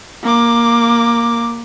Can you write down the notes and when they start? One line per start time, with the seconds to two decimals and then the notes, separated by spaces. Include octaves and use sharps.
0.23 A#3 D6